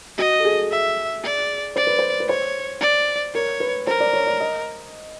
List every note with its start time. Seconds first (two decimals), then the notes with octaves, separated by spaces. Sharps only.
0.18 F#4 D#5
0.40 A4
0.45 G#4
0.71 E5
1.23 D5
1.76 C5 D5
1.87 B4
1.99 C5
2.20 B4
2.29 C5 C#5
2.81 D5
3.34 A#4 C#5
3.60 B4
3.87 A#4 C5
4.00 D5
4.13 C#5
4.27 D5
4.40 D#5